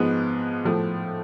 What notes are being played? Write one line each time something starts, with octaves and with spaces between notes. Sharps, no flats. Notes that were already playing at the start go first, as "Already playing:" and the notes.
Already playing: G#2 F3 G#3 B3
A2 F3 A3